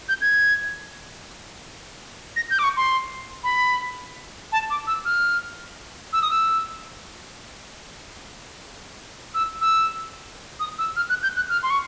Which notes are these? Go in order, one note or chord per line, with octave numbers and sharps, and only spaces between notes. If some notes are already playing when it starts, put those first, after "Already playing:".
G6
G#6
A#6
G6
D6
C#6
C6
B5
A5
D6
E6
F6
E6
D#6
E6
E6
E6
D#6
E6
F6
F#6
G6
F#6
F6
C6
C#6